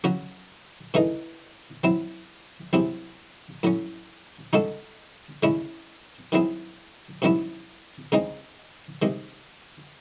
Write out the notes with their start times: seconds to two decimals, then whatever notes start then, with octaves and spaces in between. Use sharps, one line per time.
0.04 C#3 F#3 C#4 F#4
0.94 C#3 E3 A3 D#4 G#4
1.84 F#3 C4 E4
2.73 C3 F#3 C4 E4 G#4
3.63 A2 F#3 C#4
4.53 C#3 G#3 D#4 F#4 A4
5.43 C#3 G#3 C#4 E4 G#4
6.32 D#3 F#3 C4 E4 G#4
7.22 C3 D#3 F#3 C#4 E4
8.12 C#3 G#3 C4 D#4 G#4
9.02 C3 D#3 G#3